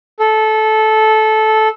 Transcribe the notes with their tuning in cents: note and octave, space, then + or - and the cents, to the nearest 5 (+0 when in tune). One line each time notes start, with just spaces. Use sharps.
A4 -15